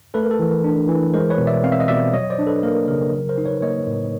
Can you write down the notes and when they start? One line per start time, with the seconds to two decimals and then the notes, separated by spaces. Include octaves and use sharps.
0.14 A3 A4 B4
0.23 A#4
0.31 A4
0.39 E3
0.48 A#4
0.64 D4
0.89 E3
1.14 G#3 A#4 C5
1.30 B4 C#5
1.38 B2
1.47 D5 E5
1.64 C4 F5
1.72 E5
1.80 D#5
1.88 B2 D5 E5
2.13 F#3 C#5 D#5
2.30 C5 D5
2.39 D4
2.47 A4 B4
2.63 A#3 A#4
2.88 C#3 A#4
3.12 F#3 A#4
3.29 A#4 C5
3.38 D#4
3.46 B4 C#5
3.62 A#3 C#5 D#5
3.87 A2